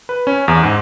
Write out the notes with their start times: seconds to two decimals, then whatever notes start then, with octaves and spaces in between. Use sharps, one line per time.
0.09 B4
0.27 C#4
0.48 E2
0.63 G#2